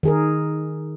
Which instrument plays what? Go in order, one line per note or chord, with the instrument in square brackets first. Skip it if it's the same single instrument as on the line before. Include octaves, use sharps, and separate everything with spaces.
[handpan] D#3 G#4 A#4